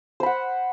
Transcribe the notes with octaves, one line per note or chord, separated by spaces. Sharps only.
C5 F#5 B5